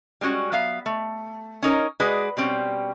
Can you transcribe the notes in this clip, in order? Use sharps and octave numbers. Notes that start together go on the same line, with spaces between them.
G3 G#3 C#4 F#4
F#3 B3 E5 F5
A3
C#4 D#4 A#4 C#5
G#3 F#4 G#4 B4 D5
B2 G3 C4 C#4